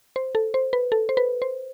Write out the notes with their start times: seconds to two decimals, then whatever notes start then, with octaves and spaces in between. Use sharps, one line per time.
0.16 C5
0.35 A4
0.54 C5
0.73 B4
0.92 A4
1.09 C5
1.17 B4
1.42 C5